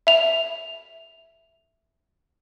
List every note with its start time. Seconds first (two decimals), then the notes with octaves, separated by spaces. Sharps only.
0.07 E5 F7